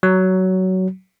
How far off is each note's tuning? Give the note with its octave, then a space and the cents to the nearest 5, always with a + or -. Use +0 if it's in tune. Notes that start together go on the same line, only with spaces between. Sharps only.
F#3 +15